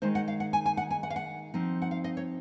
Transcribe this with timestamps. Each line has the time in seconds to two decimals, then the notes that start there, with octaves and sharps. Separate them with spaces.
0.02 D#3 G#3 D#4 C5
0.15 F#5
0.28 F5
0.40 F#5
0.53 G#5
0.66 G#5
0.77 F#5
0.91 G#5
1.03 F#5
1.10 F5
1.16 F#5
1.54 F3 C4 D#4
1.82 F#5
1.91 F5
2.04 D#5
2.17 C#5